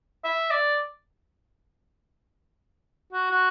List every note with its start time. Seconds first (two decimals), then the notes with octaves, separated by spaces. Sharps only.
0.24 E5
0.50 D5
3.12 F#4
3.31 F#4